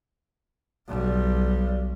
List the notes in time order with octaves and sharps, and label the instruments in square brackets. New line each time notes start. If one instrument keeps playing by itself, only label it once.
[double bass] B1 G3